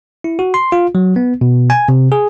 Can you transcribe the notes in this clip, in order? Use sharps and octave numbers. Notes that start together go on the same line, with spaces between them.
E4
F#4
C6
F4
F#3
B3
B2
G#5
C3
G#4